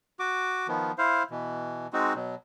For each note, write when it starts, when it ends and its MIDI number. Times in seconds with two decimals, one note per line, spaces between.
0.20 0.67 66
0.20 0.67 86
0.68 0.92 51
0.68 0.92 53
0.68 0.92 59
0.98 1.23 64
0.98 1.23 72
0.98 1.23 77
1.31 1.87 47
1.31 1.87 52
1.93 2.14 56
1.93 2.14 60
1.93 2.14 63
1.93 2.14 66
2.15 2.35 47
2.15 2.35 54